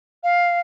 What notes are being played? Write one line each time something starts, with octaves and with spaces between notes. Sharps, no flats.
F5